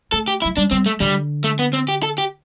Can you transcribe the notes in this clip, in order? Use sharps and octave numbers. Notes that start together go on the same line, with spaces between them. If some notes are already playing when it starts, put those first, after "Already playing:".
A3 A4
G4
E4
F#3
G3 D4
G3 C4
A3
D3 G3
A3
B3
C4
G4
A4
G4